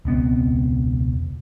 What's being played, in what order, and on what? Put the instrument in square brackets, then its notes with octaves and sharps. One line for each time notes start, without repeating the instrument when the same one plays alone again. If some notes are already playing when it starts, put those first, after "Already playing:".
[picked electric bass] E1 C#2 B3 C4